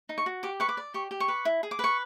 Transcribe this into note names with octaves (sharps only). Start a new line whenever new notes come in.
D#4
C#6
F#4
G4 D6
B4 C#6
D6
D5
G4 C#6
G4
C#6
B4
E4
G#4
D6
B4 C#6